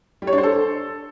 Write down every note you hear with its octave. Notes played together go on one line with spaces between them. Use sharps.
G3
C#5
D4
C5
A4